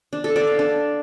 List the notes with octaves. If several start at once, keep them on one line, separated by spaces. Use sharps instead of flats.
D4
A4
D5
F5
D4